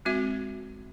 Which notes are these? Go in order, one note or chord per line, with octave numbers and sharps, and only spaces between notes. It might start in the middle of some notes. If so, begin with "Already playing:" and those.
G#3 C4 F#4 E5